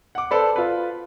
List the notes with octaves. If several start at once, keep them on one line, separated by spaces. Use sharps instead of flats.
F#5 D6
A4 B4 C5 D5 B5
F4 B4